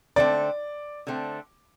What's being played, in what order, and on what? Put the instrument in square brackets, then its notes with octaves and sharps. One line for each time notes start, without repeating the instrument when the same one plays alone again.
[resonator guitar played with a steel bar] D3 A3 C4 [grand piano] D5
[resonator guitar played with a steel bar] D3 A3 C4